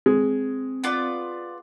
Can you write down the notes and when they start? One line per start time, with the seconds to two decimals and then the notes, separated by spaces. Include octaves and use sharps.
0.06 G#3 C4
0.84 B3 F4 D5